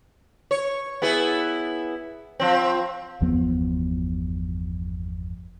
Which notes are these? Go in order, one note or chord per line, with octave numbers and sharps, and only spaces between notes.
C#5
B3 E4 G#4
F3 C4
G1 E2 F3 B3